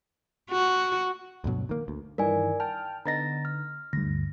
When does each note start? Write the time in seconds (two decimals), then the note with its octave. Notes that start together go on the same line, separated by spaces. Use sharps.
0.51 F#4
1.44 D2 G2 B2 F#3
1.69 D#3 A#3
1.88 D2
2.18 G2 D#3 E3 A#4 D5 G#5
2.60 G5 A5 F6
3.05 D3 B3 D#4 A#5 A6 A#6
3.45 F6
3.93 D2 G2 A#6